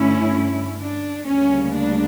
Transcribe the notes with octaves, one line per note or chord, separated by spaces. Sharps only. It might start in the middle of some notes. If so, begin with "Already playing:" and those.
Already playing: G2 D3 A3 C#4 E4
D4
D2 C#3 G3 A#3 C#4
D4